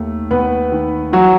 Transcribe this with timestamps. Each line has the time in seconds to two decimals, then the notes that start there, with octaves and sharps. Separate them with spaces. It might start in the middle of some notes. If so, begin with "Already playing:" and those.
Already playing: D#2 D#3 A3
0.31 D#2 B3 B4
0.72 D#3
1.13 E3 F#3 F#4